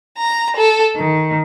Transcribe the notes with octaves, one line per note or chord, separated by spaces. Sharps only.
A#5
A4
D#3